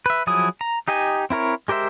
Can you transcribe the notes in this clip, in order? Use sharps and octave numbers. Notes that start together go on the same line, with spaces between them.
B4 E5
F3 F#3 E4 G#4 D#6
A#5
D#4 G4 D#5 G#5
C4 E4 A#4 C#5
G#3 G4 A#4 C5 E5